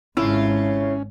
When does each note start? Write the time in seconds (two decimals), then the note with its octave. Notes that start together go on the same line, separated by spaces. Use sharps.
0.17 G#1 G#2 C#3 A3 C#4 E4 F4